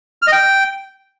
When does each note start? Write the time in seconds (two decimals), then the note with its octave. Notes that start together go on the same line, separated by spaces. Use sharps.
0.22 F6
0.27 D#5
0.32 G5